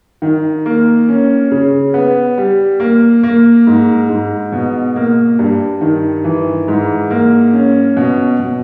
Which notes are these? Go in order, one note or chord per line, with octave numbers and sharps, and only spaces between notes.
D#3
A#3
C#4
C#3
B3
G3
A#3
A#3
G#2
G#2
B2
A#3
G2
D#3
E3
G#2
A#3
C#4
B2
B2